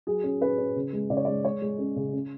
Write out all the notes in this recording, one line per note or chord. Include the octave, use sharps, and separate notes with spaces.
F#3 G#4
C#4
C#4 B4
C#4
C#3
G#3
C#3 D5
C#5
G#3 D5
G#3 C#5
G#3
C#4
C#3
C#4